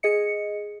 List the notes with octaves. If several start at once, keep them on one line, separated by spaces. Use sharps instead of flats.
G#4 D#5 C#7